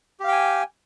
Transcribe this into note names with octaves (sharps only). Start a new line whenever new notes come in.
G4 F5 G5 G#5